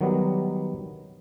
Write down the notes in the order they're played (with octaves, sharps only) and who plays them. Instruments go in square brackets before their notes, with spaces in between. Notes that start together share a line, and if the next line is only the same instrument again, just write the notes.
[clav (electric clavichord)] D#3 F#3 G3 B3